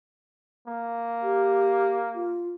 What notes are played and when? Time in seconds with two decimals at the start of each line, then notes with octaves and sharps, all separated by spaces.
0.67 A#3
1.23 G4
2.15 F4